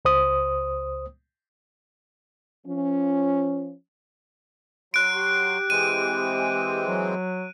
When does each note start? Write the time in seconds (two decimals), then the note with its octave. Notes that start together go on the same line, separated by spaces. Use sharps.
0.05 C#2 C5 D#6
2.66 F3 C#4
4.94 F#3 C6 F#6 D7
5.14 G4
5.70 E3 G#3 C4 D#7
6.87 F#3